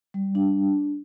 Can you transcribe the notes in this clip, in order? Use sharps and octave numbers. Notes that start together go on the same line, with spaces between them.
G3
D4